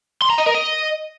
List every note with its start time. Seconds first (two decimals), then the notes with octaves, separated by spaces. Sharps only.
0.22 C6
0.30 A#5
0.38 D#5
0.47 A#4
0.55 D#5